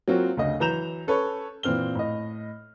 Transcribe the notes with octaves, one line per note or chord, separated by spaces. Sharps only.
F#3 A#3 C4 F4 F#4
D2 C#3 D#5
E3 F#3 A#5 G6 E7 F7
C#4 A4 B4 C#5
A#2 E3 C4 F6 G7
A2 D#5